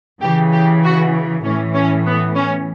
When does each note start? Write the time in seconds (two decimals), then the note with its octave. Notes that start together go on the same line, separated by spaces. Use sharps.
0.22 C#3 E3 G4
0.53 G4
0.84 F#4
1.44 A2 E3 C#4
1.75 C#4
2.06 B3
2.36 C#4